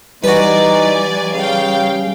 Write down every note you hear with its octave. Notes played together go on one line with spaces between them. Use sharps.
E3 G3 D#4 F#4 B4 D5 G#5
C#3 F5 G5